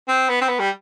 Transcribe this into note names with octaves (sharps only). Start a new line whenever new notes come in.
C4
B3
C4
B3
G3